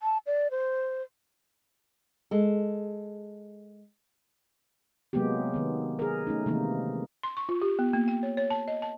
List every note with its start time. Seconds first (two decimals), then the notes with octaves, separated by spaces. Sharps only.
0.02 A5
0.26 D5
0.51 C5
2.31 G#3 A4
5.13 C3 F#3 G#3 A#3 B3 G4
5.54 D#3 B3
5.99 G#4 A#4
6.27 A3 C#4 D#4
6.46 C3 D#3 E3 G#3 A#3 D#4
7.23 C6
7.37 C#6
7.49 F4
7.62 G4
7.79 B3
7.93 A#3
8.08 G5
8.23 C#5
8.37 C#5
8.50 A5
8.68 D#5
8.82 A5